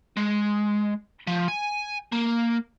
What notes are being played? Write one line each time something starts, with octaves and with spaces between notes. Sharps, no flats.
G#3
F3
G#5
A#3